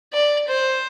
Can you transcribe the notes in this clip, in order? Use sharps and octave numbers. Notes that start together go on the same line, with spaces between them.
D5
C5